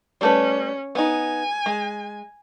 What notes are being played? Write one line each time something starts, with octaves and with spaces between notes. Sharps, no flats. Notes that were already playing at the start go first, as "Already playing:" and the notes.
G3 A3 C#4 B4
B3 D#4 G#5
G#3